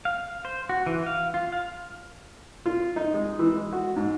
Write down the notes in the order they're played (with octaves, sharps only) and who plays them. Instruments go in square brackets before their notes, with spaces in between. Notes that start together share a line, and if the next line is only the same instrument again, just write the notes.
[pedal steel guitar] F5
C5
F#4
E3
F5
F4
F5
[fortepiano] F4
D#4
G#3
E3
G#3
F#4
G#2